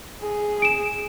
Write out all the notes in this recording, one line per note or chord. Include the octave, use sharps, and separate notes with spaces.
G#4
D7 E7